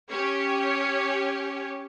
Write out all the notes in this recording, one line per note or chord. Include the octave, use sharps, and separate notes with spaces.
C#4 G4 C#5